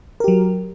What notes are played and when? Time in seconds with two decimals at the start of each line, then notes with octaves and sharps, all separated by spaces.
0.20 A#4
0.24 G4
0.28 F#3